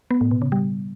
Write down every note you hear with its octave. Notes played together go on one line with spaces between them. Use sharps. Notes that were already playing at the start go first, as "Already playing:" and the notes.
B3
A2
B2
C#3
G3